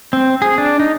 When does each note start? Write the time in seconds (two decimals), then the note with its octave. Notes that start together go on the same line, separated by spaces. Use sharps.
0.13 C4
0.42 G#4
0.58 D4
0.80 D#4